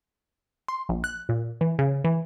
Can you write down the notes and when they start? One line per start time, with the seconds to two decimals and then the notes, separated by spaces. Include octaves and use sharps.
0.68 C6
0.89 A#1
1.04 F#6
1.29 A#2
1.61 E3
1.79 C#3
2.04 E3